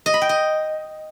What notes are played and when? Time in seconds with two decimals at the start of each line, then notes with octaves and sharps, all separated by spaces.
0.06 D#5
0.14 B5
0.22 G5
0.29 D#5